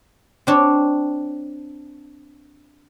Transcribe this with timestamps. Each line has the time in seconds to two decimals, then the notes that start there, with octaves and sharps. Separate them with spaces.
0.47 C4 D4 C#5